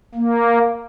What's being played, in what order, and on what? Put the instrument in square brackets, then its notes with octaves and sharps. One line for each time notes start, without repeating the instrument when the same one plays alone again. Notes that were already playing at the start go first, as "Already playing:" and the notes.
[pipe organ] A#3